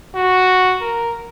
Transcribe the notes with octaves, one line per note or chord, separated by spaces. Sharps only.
F#4
A#4